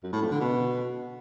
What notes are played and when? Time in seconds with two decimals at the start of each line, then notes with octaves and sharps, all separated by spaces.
0.03 F#2
0.13 A2
0.22 F2
0.31 D3
0.40 B2